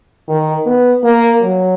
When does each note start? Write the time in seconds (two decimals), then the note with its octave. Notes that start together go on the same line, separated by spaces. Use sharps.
0.28 D#3
0.66 B3
1.04 A#3
1.41 F#3